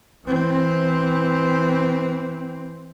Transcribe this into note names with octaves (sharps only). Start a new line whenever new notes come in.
E3 C4